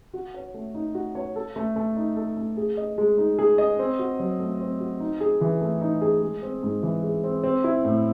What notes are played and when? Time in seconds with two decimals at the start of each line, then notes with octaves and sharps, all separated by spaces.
0.13 F#4
0.34 C#5
0.54 A3
0.74 D#4
0.95 F#4
1.15 C#5
1.36 A4
1.56 A3
1.76 A3
1.96 D#4
2.17 A4
2.37 A3
2.57 G#4
2.77 D#5
2.98 G#3
3.18 D#4
3.39 G#4
3.58 D#5
3.79 C4
3.99 F#4
4.19 F#3
4.40 A3
4.60 C4
4.80 F#4
5.00 D#4
5.20 G#4
5.41 E3
5.61 A3
5.81 D#4
6.02 G#4
6.22 G#3
6.43 C4
6.63 G#2
6.83 E3
7.03 G#3
7.24 C4
7.44 C4
7.64 E4
7.84 A2